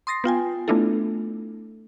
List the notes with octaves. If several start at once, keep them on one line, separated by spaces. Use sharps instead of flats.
C6 D#6 A6 A#6 C7
B3 F4 G5 G#5
A3 B3 D4 E4 F4 A4